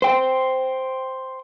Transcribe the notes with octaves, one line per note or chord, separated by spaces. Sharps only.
C5 G5